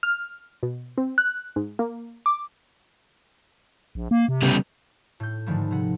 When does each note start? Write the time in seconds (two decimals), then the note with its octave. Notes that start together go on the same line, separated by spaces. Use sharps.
0.03 F6
0.63 B2
0.98 C4
1.18 F#6
1.56 G#2
1.79 A#3
2.26 D6
3.95 A#1
4.11 A#3
4.28 C3
4.43 C#3 G3 B3
5.20 A2 G6
5.46 G#2 D3 D#3 F3 G3 A3
5.71 C3 F#5